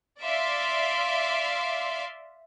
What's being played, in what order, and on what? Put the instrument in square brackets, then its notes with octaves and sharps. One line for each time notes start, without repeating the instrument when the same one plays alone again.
[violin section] D5 E5 F5 C6 D6